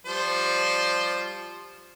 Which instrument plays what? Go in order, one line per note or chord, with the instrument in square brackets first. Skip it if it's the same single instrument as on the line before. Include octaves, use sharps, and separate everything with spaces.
[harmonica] F3 G3 C5